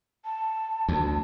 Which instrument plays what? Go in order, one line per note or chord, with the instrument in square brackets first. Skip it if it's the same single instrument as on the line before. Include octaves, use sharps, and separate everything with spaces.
[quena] A5
[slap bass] D2